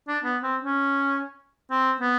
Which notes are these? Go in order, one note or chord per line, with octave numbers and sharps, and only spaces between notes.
D4
B3
C4
C#4
C4
B3